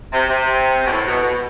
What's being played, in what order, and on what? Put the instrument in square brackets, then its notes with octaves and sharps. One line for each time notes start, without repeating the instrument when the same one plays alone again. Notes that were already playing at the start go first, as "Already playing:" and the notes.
[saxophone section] C3
C3
B2
A2
B2
B2